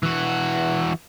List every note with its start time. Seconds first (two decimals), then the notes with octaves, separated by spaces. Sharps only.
0.03 E3 F#4